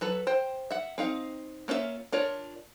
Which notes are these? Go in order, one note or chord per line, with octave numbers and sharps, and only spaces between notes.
F#3 A4 B4
C5 G5
E5 F#5
C4 D#4 F5
A#3 C#4 F4 F#4 E5
D4 F4 A#4 C#5